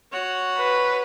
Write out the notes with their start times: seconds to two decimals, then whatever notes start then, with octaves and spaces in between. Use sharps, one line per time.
0.12 F#4 C#5
0.58 B4